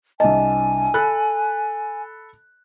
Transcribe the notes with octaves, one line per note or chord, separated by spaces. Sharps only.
C2 D4 D#5 G#5 A5
A4 B5 F#6